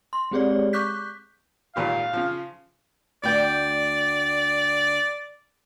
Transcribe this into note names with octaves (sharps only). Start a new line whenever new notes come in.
C6
G#3 C4 G4 G#4 C#5 D5
C#6 D6 F#6 G6 B6
G#1 A#2 G4 F5
C#3 F3
D2 D5 G5